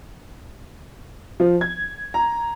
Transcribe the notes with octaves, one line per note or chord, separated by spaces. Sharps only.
F3
G#6
A#5